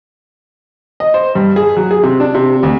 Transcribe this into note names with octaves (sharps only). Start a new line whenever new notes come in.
D#5
C5
G2
G#4
F#3
G#4
C3
D4
C3
D2